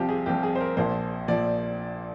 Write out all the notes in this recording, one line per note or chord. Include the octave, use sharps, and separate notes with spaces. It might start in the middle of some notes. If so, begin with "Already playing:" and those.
Already playing: C2 C3 F3 F4 G4
G#4
C2 C3 F3 G4
G#4
C5
A#4
A#1 A#2 F3 C5
A#2 F3 D5